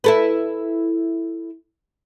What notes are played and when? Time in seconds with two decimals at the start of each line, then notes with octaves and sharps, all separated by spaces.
0.04 E4 A4 B4